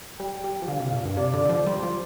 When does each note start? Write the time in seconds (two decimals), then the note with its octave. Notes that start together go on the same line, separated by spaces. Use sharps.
0.19 G3 G5
0.44 G3
0.62 F3
0.68 D3 F5
0.80 C3
0.93 A#2
1.05 G2
1.17 C3 D5
1.33 D3
1.45 D3
1.49 F3
1.66 G3 C5
1.83 F3